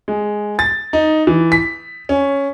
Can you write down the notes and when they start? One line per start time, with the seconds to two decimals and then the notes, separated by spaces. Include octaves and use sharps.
0.08 G#3
0.59 A6
0.93 D#4
1.27 E3
1.52 B6
2.09 C#4